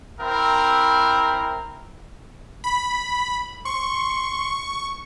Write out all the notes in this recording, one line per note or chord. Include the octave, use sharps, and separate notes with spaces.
C4 E4 A#4
B5
C6 C#6